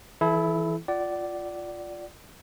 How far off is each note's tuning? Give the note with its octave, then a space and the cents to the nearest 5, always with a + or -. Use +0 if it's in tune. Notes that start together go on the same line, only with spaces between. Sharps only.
E3 +0 E4 +0 A4 -40
F4 +0 D5 +0 F#5 +35